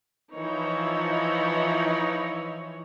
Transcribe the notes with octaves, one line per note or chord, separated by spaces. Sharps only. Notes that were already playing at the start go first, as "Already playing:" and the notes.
E3 F3 D#4 E4 B4 C#5